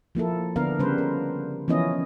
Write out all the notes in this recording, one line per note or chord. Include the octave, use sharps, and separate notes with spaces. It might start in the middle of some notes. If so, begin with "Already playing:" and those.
F3 A#3 E4 A4
D3 B3 D4 A#4 F5
C#3 G3 B4 C5
A#4
E3 F3 B3 C#4 E4 D#5